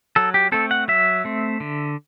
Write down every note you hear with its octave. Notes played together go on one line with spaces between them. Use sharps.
F#3 A4
G4
A3 C4 A4
F#5
F#3 E5
A3 C4
D3